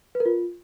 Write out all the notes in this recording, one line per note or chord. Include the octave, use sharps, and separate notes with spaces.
B4
A#4
F4